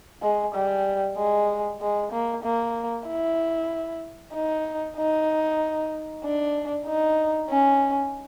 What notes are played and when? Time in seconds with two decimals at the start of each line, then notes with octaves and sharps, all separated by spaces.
0.22 G#3
0.55 G3
1.17 G#3
1.81 G#3
2.12 A#3
2.43 A#3
3.07 E4
4.34 D#4
4.97 D#4
6.24 D4
6.86 D#4
7.49 C#4